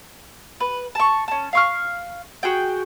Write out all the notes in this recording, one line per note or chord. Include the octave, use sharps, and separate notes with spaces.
B4
A5 C#6
C#4 A5
F5 C#6 F6
F#4 G#4 G5